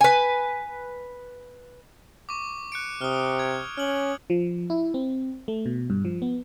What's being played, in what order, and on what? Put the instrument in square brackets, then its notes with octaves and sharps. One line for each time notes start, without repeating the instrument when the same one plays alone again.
[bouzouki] B4 G#5
[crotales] C#6 D6
F#6 C#7 D7
[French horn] C3 [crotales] D#6 F6
[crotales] G#6
[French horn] C#4 [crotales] F6 F#7
[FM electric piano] F3
E4
C4
A3
B2
G2
F3
B3